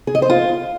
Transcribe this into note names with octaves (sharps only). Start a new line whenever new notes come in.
G#4
D#5
C5
F4